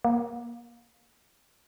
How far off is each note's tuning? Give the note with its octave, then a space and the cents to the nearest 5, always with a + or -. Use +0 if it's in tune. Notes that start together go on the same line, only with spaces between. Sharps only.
A#3 +30